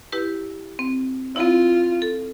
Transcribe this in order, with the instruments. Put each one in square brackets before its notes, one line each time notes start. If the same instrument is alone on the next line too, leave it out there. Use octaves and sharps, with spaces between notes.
[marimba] E4 G4 B4
C4
[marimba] C4 E4 [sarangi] F4
[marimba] A4